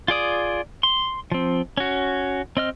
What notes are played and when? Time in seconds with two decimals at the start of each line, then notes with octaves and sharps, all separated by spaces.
0.08 F4 G#4 D5 D#6
0.83 C6
1.32 F3 C4
1.77 C#4 F#4
2.57 C4 D#5 F6